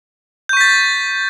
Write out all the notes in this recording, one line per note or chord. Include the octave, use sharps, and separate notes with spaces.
C#6 G6 A6 B6